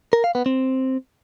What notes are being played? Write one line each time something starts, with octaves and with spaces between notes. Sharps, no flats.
A#4
F5
B3
C4